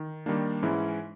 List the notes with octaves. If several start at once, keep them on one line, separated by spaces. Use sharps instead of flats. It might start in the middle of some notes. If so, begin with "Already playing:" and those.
Already playing: D#3
D#3 G3 A#3 D4
G#2 E3 G#3 C#4 E4